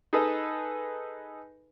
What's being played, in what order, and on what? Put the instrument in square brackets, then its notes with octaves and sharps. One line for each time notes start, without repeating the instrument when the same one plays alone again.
[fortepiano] D#4 G#4 A4 B4 D#5